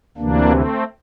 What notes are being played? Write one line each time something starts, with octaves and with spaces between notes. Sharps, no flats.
D2 C3 E3 A#3 D4
A3 C4